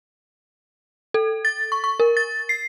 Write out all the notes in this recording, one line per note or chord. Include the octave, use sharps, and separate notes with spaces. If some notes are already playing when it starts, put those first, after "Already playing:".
A4
A6
C#6
C#6
A#4
A6
C7